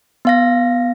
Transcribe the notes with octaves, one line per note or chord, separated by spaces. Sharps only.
B3 F5 A#6